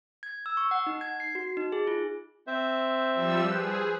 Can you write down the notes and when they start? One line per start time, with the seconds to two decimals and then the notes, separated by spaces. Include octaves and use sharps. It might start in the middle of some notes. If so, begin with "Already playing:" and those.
0.23 G#6
0.46 E6
0.57 C#6
0.71 F#5
0.87 D#4
1.01 G#6
1.20 C7
1.35 F#4
1.57 D#4
1.72 G#4
1.87 F4
2.47 C4 C5 E5
3.14 F3 G3 E6
3.50 G#4 B4 C5